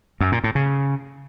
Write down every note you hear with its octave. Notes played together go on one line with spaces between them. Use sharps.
F#2
A#2
A2
C#3